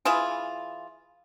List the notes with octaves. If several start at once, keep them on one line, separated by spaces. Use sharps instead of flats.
E3 E4 F4 G#4